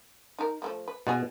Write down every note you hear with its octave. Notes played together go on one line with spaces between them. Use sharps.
D#4 A#4
F3 A3 A#3
B4
B2 E4 F#4 G#4